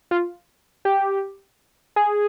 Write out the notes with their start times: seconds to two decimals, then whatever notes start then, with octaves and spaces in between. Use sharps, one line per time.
0.11 F4
0.85 G4
1.96 G#4